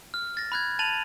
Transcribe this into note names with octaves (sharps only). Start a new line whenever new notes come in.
F6
A6 A#6
B5 F#6 G#6
A5 A6 D#7 F7 F#7